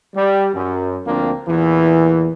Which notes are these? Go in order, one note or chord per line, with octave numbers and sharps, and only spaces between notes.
G3
F#2
D2 F3 A#3 C4 D4
E2 A#2 E3